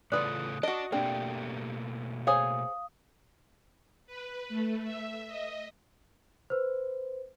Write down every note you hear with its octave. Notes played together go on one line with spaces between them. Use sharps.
A2 C#3 F4 A4 B4 D5 D#6 F#6
F#4 D5 D#5 A5
B2 A3 A#3 C4 D4 G4
G#4 C5 C#5 F5 D#6
B4
A3
E5
D#5
B4 C5